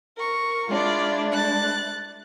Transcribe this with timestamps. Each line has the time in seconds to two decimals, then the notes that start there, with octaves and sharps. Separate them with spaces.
0.17 A#4 C#6
0.69 G#3 D4 E4 F4 D5
1.32 F#6 A6